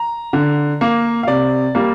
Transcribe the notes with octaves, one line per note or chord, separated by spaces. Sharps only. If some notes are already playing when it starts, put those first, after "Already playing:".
Already playing: A#5
D3
A#3
F5
C3 D5
G3 A#3